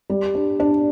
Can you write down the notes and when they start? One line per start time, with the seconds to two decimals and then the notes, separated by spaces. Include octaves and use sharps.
0.10 G3
0.35 D4
0.60 D4